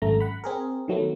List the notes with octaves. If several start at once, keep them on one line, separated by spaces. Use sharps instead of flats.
G#1 F#2 A3 A#5
F#5 B5
C4 G#4 A#4
D#3 F#3 A3 B3